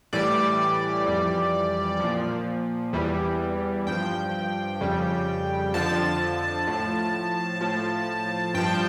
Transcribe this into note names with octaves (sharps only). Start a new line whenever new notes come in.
A2 E3 G3 D5
F2 E3 G3
A#2 F3
E2 E3 G3
G2 F3 G5
F2 C#3 G3
F2 D3 F3 A5
A2 F3
A2 F3
G2 F3 G5